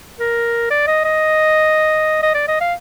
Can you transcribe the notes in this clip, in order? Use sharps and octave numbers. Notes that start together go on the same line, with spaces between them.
A#4
D5
D#5
D#5
D#5
D5
D#5
F5